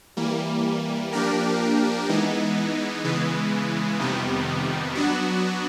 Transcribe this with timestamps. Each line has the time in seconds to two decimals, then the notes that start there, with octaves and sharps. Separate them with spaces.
0.17 E3 G3 A#3
1.13 F3 A#3 D4 G4 A#4
2.09 E3 G#3 B3 D#4
3.04 C#3 E3 G#3 B3
4.00 F2 C3 D#3 G3 B3
4.95 F#3 B3 D4 F#4